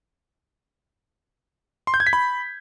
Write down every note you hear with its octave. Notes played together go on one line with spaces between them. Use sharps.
C6
G6
G#6
B6
B5